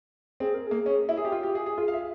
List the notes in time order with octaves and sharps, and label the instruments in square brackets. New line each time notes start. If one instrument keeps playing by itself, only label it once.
[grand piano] C4 [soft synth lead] G#4
[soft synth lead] A#4
[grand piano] A#3 [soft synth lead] G#4
[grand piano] C#4
E4
G#4
G4
F4
G4
G#4
G#4
[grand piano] F4 [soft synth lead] G#4
[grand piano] F5
E5